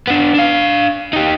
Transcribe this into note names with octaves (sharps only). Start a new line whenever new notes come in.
B3 D4
D4 F5
D#4 G4